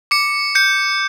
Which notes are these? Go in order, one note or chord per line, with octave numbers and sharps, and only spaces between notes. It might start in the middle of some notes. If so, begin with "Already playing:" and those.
D6 C#7
G6 C#7